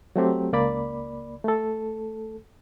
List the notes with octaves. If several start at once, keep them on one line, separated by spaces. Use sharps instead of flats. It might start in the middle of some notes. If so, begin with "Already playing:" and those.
F#3 A3 C4 G4
C#2 A#3 D5 B5
A3 A4